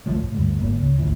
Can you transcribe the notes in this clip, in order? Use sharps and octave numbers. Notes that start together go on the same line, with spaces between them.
D1 B1 F3 A3
A2
D2 G2 G#3
G1 G#2 A#3
C#2
G#1 D2 A2 E3